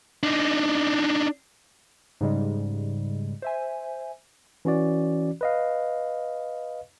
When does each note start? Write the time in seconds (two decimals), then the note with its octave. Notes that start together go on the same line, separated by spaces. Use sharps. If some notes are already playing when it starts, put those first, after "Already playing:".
0.23 D4 D#4
2.21 G#2 C#3 G3 G#3
3.42 C5 E5 G#5
4.65 E3 C#4 F#4 D5
5.41 B4 D#5 F5